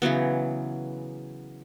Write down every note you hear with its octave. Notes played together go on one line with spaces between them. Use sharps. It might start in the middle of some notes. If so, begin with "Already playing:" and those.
C#3 E3 F#3 B3